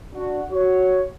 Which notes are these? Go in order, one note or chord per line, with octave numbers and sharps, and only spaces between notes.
D4 F#4
F#4 C#5